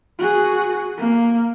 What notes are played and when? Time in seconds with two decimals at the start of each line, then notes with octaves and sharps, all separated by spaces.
0.19 F#4 G#4
0.97 A#3